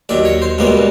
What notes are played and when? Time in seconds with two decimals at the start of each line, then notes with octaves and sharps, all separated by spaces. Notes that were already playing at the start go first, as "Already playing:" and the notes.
0.09 D#2 D#3 F#3 D5
0.25 C#5
0.42 C5
0.58 C#2 B2 G3 A#3 C#4